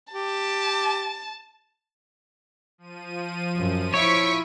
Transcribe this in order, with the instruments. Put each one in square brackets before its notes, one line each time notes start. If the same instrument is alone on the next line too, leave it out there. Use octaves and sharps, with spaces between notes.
[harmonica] G4 [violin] A5
[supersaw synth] F3 D#7
[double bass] F#2
[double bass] E4 [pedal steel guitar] C#5 [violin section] C#6 B6 D7